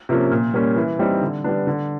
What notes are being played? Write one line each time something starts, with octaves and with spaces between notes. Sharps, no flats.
C3 F3 A#3 C#4
A#2
G3 A#3 C#4
E3
G3 C4 D#4
D3
G3 B3 D4
D3